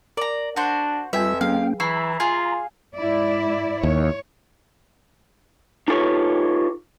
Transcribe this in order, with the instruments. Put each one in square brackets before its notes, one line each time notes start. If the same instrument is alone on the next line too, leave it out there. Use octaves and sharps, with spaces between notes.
[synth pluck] A#4 [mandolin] D5 A#5
[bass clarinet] D4 [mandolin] F#4 C5
[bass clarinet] F2 [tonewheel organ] G3 F4 [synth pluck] B4 G5 G#5 [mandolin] E5
[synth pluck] F#3 G#4 [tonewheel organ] A#3 C#4 G5 [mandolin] F5
[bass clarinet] E3 [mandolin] E4 [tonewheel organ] A#5 [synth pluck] C#6 E6 C7
[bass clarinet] F4 [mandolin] G#4 F5
[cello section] G#2 E4 D5
[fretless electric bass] D#2 [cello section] C#5
[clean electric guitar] D#4 F4 G4 A4 B4 C#5